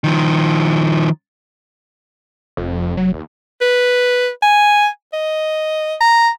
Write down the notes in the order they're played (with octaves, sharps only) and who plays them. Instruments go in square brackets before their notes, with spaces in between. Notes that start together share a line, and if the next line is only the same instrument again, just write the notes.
[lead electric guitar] D#3 F3
[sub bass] F1 [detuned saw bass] F2
[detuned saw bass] F#3
D#2
[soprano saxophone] B4
G#5
D#5
A#5